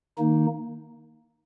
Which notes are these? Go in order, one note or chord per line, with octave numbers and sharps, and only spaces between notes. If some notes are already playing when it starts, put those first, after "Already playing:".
D#3 A#3 D#4